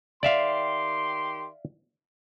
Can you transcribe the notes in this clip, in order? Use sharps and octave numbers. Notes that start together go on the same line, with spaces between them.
D#3 G4 D5 E5 F5 C6